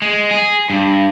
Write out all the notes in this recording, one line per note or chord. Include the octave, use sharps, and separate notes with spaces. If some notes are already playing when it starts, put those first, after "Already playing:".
G#3
G#4
G2